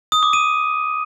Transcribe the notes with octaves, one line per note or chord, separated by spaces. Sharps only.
D#6
D6
D#7